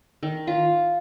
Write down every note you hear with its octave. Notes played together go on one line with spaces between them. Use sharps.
D#3
F4